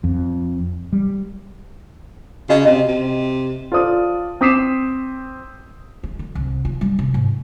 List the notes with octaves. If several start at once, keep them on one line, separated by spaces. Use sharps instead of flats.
F2
G3
C#3 F#4 D#5
C3 D#5
C3
F4 A4 C5 D5 D#6
C4 D6 D#6 B6 C7 E7
G#3
D3
C2
F4
G3
C3
G#2